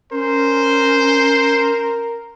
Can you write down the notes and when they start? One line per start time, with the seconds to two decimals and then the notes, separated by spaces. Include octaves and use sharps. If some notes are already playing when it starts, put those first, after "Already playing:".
0.12 C#4 A#4 C5